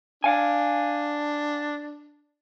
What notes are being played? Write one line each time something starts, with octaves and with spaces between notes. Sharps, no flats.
D4 F5 G#5